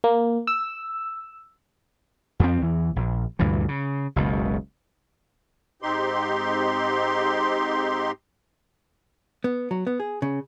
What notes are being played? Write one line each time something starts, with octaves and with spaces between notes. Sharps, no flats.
A#3
E6
F2 F3 C4
E2 E3
A#1
D2 G2 A#2 E3
C#3
F#1 C#2 B2
G#2 C4 D#4 G4 C6
B3
F#3
B3
G#4
C#3